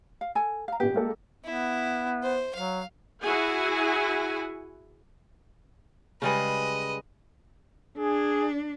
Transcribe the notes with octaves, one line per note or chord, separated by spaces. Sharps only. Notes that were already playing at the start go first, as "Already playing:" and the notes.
F5
A4 G#5
F5 A#5
A#1 B3 G4
G#3 A#3 A4
B3 E4
C5
F#3 F5
E4 F#4 G#4 F#5 G#5
C#3 G3 G#3 B4 D#5
D4 G#4